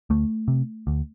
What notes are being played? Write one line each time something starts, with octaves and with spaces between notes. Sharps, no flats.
D2 A3
C3
D2